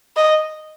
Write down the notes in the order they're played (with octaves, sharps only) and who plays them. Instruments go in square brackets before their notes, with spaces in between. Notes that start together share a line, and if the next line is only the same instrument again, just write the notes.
[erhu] D#5